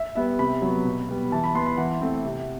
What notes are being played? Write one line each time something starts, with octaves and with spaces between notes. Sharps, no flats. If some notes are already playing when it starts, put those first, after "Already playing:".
Already playing: E5
G3 B3 E5
C3 B5
F#3 B3
B2
G3 B3
E3 A5
B5
B3 C6
B5
E3 F#5
A3 C4
C3